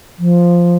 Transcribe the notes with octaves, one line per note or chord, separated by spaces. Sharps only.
F3